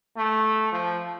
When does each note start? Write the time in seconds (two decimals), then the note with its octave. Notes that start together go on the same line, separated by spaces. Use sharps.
0.17 A3
0.72 F3